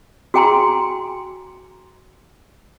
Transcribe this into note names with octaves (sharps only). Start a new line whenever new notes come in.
F#4 G#4 G5 G#5 A#5 C6